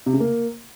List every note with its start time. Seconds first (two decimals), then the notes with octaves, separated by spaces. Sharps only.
0.06 C3
0.13 C#3
0.20 A#3